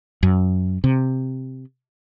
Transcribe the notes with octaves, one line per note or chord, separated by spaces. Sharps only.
F#2
C3